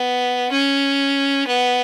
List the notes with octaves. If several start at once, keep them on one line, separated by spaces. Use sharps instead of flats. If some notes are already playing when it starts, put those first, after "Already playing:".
Already playing: B3
C#4
B3